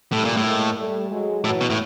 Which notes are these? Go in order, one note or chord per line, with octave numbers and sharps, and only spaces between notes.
A2 G3 A3
A#2
A2
G#3 A#3
G3 A3
F#3 G#3
A2 E3 F#3
B2
A2